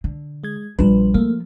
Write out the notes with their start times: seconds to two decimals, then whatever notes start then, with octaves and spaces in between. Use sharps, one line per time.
0.04 D3
0.43 G#3 G#6
0.79 A#1 F3 G3 D4 B4
1.14 F3 A3 A#3